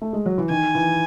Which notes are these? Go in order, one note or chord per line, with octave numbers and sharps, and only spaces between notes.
A3
G#3
F#3
E3
D#3 G#5
E3